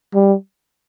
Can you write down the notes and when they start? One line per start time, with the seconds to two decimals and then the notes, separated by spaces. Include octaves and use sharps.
0.14 G3